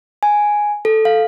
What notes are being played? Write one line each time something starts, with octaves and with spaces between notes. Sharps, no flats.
G#5
A4
F5